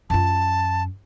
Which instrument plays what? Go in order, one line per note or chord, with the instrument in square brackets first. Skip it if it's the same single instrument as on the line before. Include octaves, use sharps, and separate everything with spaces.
[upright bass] F#2 F4 [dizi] A5